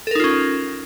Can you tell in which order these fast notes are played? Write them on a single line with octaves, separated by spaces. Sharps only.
A4 A#4 D#4 F4 C#4